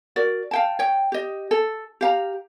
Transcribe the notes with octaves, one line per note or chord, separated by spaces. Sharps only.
F#4 A#4 D5
F5 G5 A5
C#5 G5
G4 D#5
A4
G4 F5 A#5